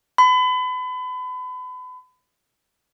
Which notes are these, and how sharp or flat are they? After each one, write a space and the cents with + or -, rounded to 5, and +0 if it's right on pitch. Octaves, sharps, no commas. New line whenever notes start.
B5 +35